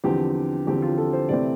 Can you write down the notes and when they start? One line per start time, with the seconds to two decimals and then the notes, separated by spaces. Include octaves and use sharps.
0.04 E2 D3 F3 C4 G4
0.67 E2 D3 F3 C4 G4
0.82 F4
0.98 A4
1.13 C5
1.29 C3 E3 A3 C4 D5